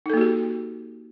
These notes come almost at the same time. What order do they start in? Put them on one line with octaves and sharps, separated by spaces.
D#4 A4 A#3 F#4 G4